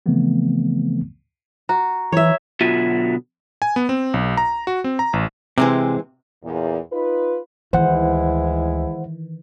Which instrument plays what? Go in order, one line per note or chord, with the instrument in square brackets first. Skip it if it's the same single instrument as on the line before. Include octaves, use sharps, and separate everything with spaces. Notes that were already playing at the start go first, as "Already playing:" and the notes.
[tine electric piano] C#3 E3 F3 A3 B3 C4
[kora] F#4 [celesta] A#5
[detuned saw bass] E3 [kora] C#5 E5
[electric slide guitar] B2 D3 F#3 F4 E5
[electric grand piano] G#5
B3
C4
B1
A#5
F#4
C4
A#5
A1
[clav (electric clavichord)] C3 [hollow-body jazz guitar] E3 G#3 C4
[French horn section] E2 A#2
D#4 F4 B4
[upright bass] D2 [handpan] D#3 E3 [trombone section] G#3 E4 [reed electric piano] C5 F#5